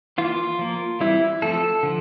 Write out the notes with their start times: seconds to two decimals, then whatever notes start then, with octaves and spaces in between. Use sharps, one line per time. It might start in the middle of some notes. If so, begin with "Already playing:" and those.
0.18 E3 A#3 F4
0.59 F3 A#3
1.00 E3 G3 C4 E4
1.42 F3 A3 C4 A4
1.83 D3 F3